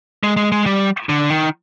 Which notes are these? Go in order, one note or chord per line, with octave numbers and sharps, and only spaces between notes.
G#3
G#3
G#3
G3
D3
D#3